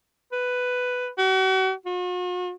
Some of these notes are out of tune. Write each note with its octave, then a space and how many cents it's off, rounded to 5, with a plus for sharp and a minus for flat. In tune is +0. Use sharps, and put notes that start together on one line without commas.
B4 +5
F#4 +40
F#4 -45